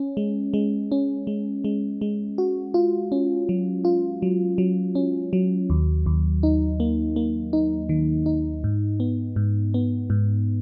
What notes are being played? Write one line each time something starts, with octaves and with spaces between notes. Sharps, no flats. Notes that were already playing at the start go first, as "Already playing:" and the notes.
Already playing: C#4
G#3
G#3
C#4
G#3
G#3
G#3
F#4
F4
C#4
F#3
F4
F#3
F#3
C#4
F#3
D#2
D#2
D#4
A#3
A#3
D#4
D#3
D#4
G#2
B3
G#2
B3
G#2